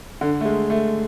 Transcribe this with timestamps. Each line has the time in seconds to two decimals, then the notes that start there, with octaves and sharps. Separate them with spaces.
0.21 D3
0.41 A3
0.45 G#3
0.70 A3